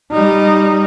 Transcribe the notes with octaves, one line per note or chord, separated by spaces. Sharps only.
G3 D#4